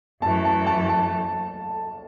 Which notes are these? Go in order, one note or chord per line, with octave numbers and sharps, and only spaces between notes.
F#2 E3 A3 A5
A5
A5
A5